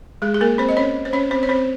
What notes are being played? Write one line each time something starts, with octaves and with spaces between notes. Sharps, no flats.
G#3 G#4
G#4
A#3 A#4
C4 C5
D#5
C#4 C#5
C5
C#4 C#5
C4 C5
C#5
C4 C5